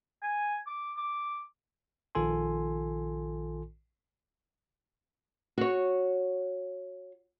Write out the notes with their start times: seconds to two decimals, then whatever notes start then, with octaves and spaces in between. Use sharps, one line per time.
0.23 G#5
0.67 D6
0.97 D6
2.15 A#1 D#3 F4 A4 G#5 C6
5.58 F#4 C#5